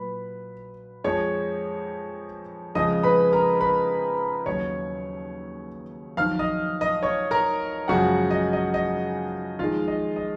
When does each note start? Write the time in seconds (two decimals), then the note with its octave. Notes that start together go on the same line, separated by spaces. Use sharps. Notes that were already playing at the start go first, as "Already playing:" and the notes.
Already playing: A#2 F#3 B4 B5
1.04 F2 F3 G#3 C#5 C#6
2.75 F2 C#3 F3 G#3 D#5 D#6
3.03 B4 B5
3.33 A#4 A#5
3.60 B4 B5
4.46 D#2 C#3 F#3 C#5 C#6
6.17 F2 D#3 F#3 F5 F6
6.39 D#5 D#6
6.81 D#5 D#6
7.03 C#5 C#6
7.31 A#4 A#5
7.88 F#2 C#3 F3 G#3 F#4 F#5
8.31 D#5
8.53 D#5
8.74 D#5
9.59 F2 D#3 G#3 F4 F5
9.88 D#5
10.16 D#5